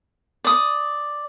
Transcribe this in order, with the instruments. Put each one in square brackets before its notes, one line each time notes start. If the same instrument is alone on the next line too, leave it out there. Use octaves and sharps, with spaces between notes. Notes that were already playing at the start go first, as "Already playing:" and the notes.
[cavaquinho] D5 D#6